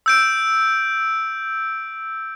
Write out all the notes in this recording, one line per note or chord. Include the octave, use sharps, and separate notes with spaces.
E6 G6 D7